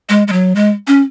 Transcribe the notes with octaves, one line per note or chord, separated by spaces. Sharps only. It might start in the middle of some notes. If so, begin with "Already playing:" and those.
G#3
G#3
F#3
G#3
C#4